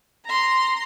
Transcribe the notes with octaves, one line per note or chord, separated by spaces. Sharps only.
A#5 C6